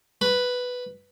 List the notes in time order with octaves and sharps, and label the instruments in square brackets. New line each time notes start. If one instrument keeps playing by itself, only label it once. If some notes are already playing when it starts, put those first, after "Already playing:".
[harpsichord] B4